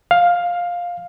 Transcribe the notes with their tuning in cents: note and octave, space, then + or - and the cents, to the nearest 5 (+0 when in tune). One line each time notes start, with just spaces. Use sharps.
F5 +10